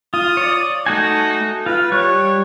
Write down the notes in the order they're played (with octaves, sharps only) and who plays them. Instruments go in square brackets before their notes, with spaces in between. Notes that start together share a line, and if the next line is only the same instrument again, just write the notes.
[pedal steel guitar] F4 [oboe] D#6
[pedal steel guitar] C#5 D5
[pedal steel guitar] A3 F#4 G#5 [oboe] D#4
[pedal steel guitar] F4 [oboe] B4
[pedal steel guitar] G3 C#6 F#6 [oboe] C#5